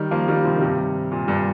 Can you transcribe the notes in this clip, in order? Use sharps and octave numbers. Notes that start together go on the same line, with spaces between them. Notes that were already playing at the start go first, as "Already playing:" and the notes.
Already playing: D#3 G3
F3 A#3
D#3 G3
C3 F3
D#3
G2 C3
A#2
G2